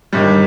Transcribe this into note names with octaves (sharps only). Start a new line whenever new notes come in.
G1 G2 D#3 G3